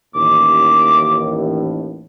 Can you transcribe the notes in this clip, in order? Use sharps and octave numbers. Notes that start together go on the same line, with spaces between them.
A1 D#2 A2 D6